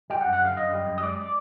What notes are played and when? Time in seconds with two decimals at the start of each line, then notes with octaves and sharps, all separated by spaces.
0.10 G3 G5
0.21 F#5
0.26 F#2
0.33 F#5
0.41 D3 F5
0.57 F#2 D#5
0.71 G3
0.86 F#2
0.98 D#5
1.02 G#3 D5